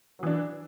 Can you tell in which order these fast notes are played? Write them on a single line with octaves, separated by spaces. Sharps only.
F#3 E3 D4